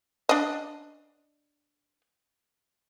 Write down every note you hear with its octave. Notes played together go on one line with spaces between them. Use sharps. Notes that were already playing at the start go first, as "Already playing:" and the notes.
D4 D#5